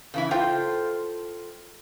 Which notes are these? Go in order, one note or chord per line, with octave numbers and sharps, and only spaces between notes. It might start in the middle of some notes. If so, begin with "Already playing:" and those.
C#3 E3 E4
F4 A4 C5 G5